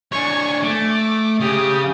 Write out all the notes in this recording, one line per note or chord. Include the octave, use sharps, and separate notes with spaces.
D4 C#5 G#5 C#6
A3 D6
C#3 G4 D#6